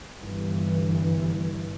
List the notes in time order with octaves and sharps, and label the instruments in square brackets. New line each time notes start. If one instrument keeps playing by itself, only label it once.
[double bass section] G1 G2 E3